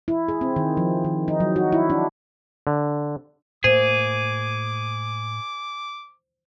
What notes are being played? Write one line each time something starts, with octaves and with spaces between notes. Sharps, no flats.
E4
G#4
C4
D#3
F3
D#3
D#4
F#3
F#4
E4
D4
D3
A2 A#3 G#4 C5 D6